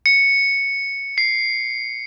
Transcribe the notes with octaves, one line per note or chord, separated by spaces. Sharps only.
C#7
C7